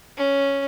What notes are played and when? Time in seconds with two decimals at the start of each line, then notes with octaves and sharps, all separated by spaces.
0.17 C#4